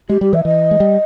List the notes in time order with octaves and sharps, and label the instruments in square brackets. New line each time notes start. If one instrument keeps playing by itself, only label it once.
[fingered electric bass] G#3 [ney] G4
[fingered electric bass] G3 [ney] G4
[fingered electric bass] E3 [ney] E5
[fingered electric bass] E3 [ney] D#5
[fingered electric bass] G#3
G3